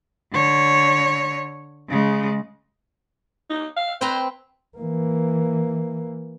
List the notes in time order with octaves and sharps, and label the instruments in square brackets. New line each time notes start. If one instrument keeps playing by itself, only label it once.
[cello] D3 C#5
C#3 G#3
[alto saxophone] D#4
F5
[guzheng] C4 B4 A#5 [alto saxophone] C5
[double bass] E3 A#3